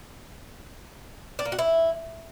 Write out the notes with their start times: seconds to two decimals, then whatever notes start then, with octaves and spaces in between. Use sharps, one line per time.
1.39 D4
1.45 A#3
1.52 F#4
1.59 E4